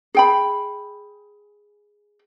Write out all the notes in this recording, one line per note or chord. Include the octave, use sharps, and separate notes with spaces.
G#4 G5 B5